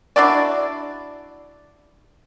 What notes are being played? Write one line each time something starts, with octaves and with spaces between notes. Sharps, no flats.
D4 E4 F#4 D5